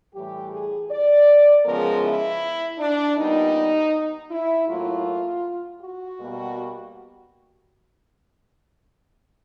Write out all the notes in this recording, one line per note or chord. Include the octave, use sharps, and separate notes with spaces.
A2 E3 G3 G4
G#4
D5
C#3 F3 G#3 B3 A#4
E4
D4
A#2 G3 B3 D#4
E4
A2 F#3 A#3 F4
F#4
B2 G3 A#3